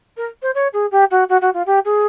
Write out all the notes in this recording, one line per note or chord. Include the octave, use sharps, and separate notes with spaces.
A#4
C5
C#5
G#4
G4
F#4
F#4
F#4
F4
G4
G#4